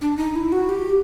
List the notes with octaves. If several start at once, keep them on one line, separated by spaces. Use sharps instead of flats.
D4
D#4
E4
F#4
G4